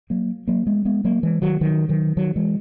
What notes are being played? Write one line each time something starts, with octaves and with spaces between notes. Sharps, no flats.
F#3 A#3
F#3 A#3
G#3 B3
G#3 B3
F#3 A#3
E3 G#3
D#3 F#3
D#3 F#3
D#3 F#3
D#3 F#3
E3 G#3